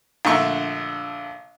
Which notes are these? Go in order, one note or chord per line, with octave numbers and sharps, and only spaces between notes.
A#1 D3 A3 C#6